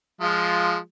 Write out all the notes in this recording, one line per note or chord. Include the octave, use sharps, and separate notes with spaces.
F3 G#3 F4